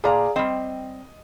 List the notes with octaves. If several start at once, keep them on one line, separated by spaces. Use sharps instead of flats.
A#2 G#4 D5 F5 A#5
G3 C4 D#5